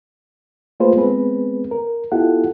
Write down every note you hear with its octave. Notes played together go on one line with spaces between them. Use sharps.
A3 A#3 F4 G#4 B4 C5
G#3 B3 C4 G#4 B4
A#4
B3 E4 F4 G4 A4 F#5